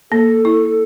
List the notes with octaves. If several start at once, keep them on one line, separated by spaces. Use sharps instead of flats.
A#3 A4
E4